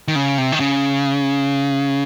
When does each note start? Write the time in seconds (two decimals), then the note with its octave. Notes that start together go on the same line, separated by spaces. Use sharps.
0.08 D#3
0.16 C#3
0.38 C3
0.52 D#3
0.60 C#3